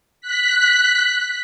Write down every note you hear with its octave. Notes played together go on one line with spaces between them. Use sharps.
F#6 B6